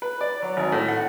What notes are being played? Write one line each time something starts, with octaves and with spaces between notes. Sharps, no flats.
B4
D5
F#3
G#1
A2
F#5